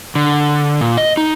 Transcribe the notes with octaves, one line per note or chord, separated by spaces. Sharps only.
D3
A#2
D#5
D#4